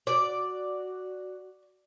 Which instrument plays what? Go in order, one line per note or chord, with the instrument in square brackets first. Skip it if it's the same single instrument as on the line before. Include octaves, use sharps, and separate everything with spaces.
[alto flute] F#4 [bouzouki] D5